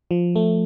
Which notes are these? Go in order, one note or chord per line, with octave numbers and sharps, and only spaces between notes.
F3
A3